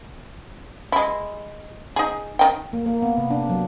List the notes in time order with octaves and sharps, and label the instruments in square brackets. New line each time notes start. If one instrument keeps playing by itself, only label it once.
[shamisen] G#3 E4
D#4 G#4
D#3 G5
[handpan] A#3
A#3
B3
C3
D4
F#3